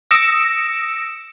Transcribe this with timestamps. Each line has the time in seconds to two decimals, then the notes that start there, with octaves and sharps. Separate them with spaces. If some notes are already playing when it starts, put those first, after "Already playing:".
0.11 D#6 E6 A#6 C#7 D7 E7